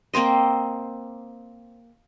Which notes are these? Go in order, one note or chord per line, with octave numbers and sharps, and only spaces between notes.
A#3 C4 C5 D#5